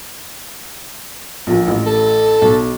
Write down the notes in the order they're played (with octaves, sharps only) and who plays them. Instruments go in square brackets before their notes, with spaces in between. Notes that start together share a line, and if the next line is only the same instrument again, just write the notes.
[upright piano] A#1 A#2 F3
A1
[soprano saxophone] A4
[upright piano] B1